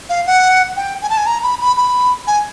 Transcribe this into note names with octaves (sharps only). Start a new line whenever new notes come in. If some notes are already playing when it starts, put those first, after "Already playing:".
F5
F#5
G5
G#5
A5
G#5
A#5
B5
B5
B5
G#5